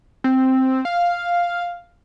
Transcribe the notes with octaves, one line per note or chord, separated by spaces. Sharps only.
C4
F5